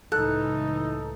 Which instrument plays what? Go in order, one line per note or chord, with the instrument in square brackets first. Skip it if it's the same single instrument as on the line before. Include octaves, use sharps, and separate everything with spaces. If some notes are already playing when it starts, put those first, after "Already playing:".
[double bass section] C#2 A2 E3 [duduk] D#4 [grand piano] A4 [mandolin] F#6